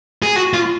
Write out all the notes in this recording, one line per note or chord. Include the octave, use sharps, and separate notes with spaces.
G#4
F#4
F4